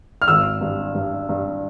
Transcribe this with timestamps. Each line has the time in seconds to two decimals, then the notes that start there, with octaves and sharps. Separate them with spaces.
0.22 F6
0.28 G#1 E6
0.61 G2
0.94 G2
1.29 G2